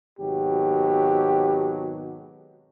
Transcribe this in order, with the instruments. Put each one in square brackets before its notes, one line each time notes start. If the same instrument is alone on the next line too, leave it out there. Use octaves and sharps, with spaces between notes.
[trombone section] G#1 B2 F#3 [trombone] G4